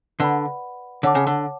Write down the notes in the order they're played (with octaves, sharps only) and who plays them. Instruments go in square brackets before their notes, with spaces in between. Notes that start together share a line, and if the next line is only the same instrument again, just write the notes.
[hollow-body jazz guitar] D3 [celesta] B4 D5 F#5 B5
[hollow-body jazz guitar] D3 [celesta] C#5 F#5 A5 D6
[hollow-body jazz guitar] C#3
D3